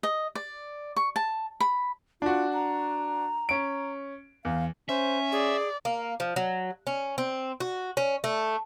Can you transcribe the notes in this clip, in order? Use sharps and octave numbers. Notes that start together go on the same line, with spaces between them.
D#5
D5
C#6
A5
B5
D4 F4 F#4
A#5
C#4 D7
E2 F5
C#4 C5 E5
G#4 D5
A#3
F3
F#3
C#4
C4
F#4
C#4
A3